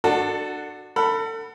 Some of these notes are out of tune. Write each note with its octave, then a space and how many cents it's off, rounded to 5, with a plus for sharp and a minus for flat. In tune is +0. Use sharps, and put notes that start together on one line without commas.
D4 +25 F#4 +0 A4 +0
A4 +35 F#5 +0 B5 +0